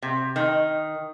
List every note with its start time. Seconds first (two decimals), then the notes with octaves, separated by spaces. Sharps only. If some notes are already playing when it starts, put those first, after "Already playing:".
0.03 C3
0.36 D#3